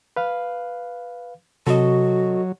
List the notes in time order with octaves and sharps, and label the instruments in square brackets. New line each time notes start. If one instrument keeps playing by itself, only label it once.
[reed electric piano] B4 F5
[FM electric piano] C3 [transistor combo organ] F#3 [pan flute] F#4 [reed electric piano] A4 D#5